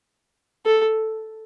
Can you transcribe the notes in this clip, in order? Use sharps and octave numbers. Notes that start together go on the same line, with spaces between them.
A4